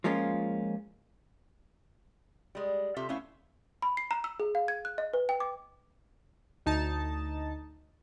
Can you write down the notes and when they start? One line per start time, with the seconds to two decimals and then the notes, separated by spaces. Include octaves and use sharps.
0.04 F3 G#3 A#3 C#4 F4
2.55 G3 G#3
2.96 C3 F4 G4 A4 E5
3.09 A3 B3 C#4 E4 E5 F5
3.82 B5
3.97 C7
4.11 A#5
4.24 E6
4.40 G#4
4.55 F5
4.68 G#6
4.85 F#6
4.98 D#5
5.13 B4
5.29 G5
5.40 D6
6.66 D2 D#4 A5